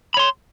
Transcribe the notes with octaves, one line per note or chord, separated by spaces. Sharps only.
C#5 B5 C6